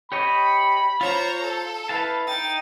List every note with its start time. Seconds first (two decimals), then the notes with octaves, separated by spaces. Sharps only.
0.12 G4 C#5 D#5 B5
1.01 F4 C5 C#5 A#5
1.43 A4
1.89 E4 B4 F5 A5
2.27 D#4 G5 A6